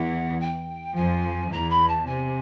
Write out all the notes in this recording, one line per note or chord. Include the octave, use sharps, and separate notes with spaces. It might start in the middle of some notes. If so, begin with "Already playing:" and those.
Already playing: E2 E3 F#5
G5
F2 F3 G#5
E2 E3 A#5
B5
A5
C3 G#5